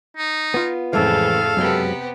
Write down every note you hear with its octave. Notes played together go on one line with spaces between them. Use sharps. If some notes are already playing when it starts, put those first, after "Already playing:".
D#4
B3 F4
F2 A2 C#3 E3 G#3 C4 A4 F5
F#2 C3 F#3 G#3 B3 G4